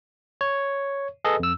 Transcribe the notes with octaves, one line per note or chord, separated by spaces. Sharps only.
C#5
G#4 A4 B4 D#5
F2 E6